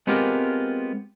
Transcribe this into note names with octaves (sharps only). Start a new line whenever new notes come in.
G#3 B3 C4 F4 G4 A#4